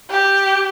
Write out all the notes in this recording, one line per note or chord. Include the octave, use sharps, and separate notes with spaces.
G4